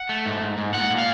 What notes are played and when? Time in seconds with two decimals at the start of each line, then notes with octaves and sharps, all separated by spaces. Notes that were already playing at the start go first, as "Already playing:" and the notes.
Already playing: F#5
0.09 A3
0.26 G#2
0.42 G#2
0.58 G#2
0.74 A#2 F#5
0.90 A#2
0.98 F5